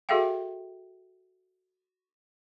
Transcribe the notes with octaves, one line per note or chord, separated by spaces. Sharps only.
F#4 G#4 A4 E5 F5 G5